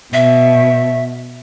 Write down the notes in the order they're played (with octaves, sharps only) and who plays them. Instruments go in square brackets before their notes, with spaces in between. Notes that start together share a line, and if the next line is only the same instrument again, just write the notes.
[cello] B2 [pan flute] E5